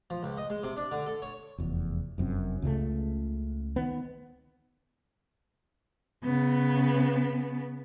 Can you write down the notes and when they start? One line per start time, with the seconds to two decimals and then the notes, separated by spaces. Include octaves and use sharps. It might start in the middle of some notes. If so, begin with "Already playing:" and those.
0.10 F3
0.23 C#2
0.37 D#5
0.50 G#3
0.63 C3
0.77 D4
0.91 D3
1.06 A4
1.22 C#5
1.58 F1 E2
2.18 F1 F#2 C4
2.62 C#2 C#3 E3 A3
3.76 D#3 B3
6.24 C#3 B3